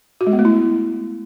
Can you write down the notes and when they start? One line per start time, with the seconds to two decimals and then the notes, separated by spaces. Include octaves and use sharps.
0.21 F#4
0.27 G#3
0.33 B3
0.39 A3
0.45 E4